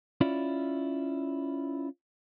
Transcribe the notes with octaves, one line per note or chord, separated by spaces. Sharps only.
C#4 E4 F4 D5